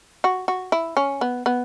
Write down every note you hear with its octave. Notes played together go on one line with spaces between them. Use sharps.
F#4
F#4
E4
C#4
B3
B3